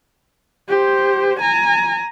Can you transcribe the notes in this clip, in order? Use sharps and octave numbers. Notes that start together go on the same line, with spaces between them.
G4 C5
G#5 A#5